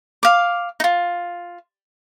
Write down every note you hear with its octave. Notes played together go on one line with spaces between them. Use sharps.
F5 D6
D#4 F4